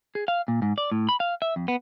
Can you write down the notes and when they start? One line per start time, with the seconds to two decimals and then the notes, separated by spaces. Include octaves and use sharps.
0.15 G#4
0.28 F5
0.48 A#2
0.62 G#2
0.78 D5
0.92 A2
1.09 B5
1.20 F5
1.42 E5
1.56 F2
1.68 B3